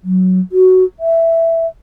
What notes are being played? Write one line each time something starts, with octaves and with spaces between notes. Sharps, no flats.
F#3
F#4
E5